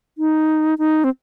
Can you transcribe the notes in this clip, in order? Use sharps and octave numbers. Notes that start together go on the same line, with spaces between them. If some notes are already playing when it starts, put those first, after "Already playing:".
D#4
D#4
C4